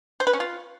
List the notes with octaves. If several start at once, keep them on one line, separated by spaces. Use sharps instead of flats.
C5
B4
C#4
F4